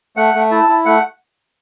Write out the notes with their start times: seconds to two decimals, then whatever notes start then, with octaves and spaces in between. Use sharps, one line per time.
0.16 A3 F#5
0.34 A3
0.51 E4 A5
0.68 E4
0.85 A3 F#5